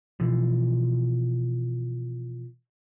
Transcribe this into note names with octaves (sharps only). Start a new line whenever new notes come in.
B2 E3 F3